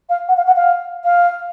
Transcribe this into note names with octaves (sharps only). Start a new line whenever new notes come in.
F5
F#5
F5
F#5
F5
F5